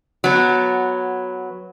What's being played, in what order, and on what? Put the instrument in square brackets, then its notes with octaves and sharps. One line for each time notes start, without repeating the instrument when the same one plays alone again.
[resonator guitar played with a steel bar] F#3 B3